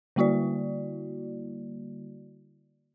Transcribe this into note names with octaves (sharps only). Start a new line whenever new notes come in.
D3 G3 A#3 E4 F#4 D5